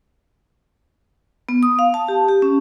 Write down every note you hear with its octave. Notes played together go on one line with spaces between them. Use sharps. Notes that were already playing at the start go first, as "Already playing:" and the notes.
B3
D#6
F5
A5
G4
G4
C#4